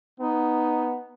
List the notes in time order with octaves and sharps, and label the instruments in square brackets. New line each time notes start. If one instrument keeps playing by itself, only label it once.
[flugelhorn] B3 [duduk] D#4